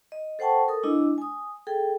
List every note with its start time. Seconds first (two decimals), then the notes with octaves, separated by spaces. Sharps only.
0.12 D#5
0.39 A4 C5 F#5 G5 A5 C#6
0.68 A4 A#4 D#6
0.83 G#3 D4 E4 D#5
1.18 G#5 D#6
1.67 G#4 A4 G5